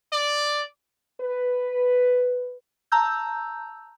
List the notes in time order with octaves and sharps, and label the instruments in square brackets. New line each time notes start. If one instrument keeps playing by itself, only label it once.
[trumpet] D5
[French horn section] B4
[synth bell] A5 A#5 E6 G6